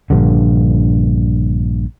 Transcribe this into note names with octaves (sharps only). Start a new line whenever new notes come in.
A#1 G2 D3